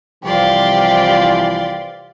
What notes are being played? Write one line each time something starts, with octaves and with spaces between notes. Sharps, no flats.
C2 E3 F3 G4 D5 F5 C6